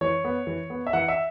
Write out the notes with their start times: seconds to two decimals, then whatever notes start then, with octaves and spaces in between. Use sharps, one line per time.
0.01 E3 C#5
0.24 B3
0.47 E3
0.70 B3
0.87 E5
0.93 E3 F#5
1.08 E5